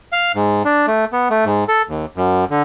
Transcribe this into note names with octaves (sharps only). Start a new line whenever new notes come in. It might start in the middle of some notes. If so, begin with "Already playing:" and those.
F5
G#2
D4
A3
B3
A3
G#2
A4
D#2
F#2
D3